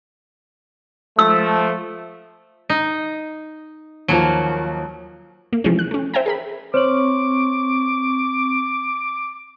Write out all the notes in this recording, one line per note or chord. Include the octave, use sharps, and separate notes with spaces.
F3 A3 E6
D#4
D#2 F3 F#3 A#3
A#3
C3 E3 F3 G#3 A3 C#4
F#6
A3 C#4
C5 E5 G5 G#5 A#5
G#4 A#4 B5
C4 C5 C#5 C#6 D6 F#7